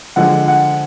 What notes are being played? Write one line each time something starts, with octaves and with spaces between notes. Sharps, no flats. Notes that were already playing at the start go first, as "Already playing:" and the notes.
D3 F3 G#3 F#5
F#5